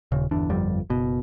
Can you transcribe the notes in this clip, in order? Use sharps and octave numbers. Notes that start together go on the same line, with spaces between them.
D#1 C#3
G1 E2 D4
G1 F2 G3
F#1 B2